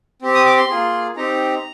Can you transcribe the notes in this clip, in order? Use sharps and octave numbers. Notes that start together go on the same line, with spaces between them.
C4 G4
D#6
D6
C6
A#3 F4 G#4
C4 D#4 G4 A#5